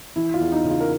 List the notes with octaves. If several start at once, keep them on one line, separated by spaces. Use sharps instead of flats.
E3 E4
F4
E2
D#4
C#3
F4
A#4